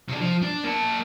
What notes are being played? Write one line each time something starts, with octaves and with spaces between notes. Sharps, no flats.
C3 D4
F3
D4
A#3 A5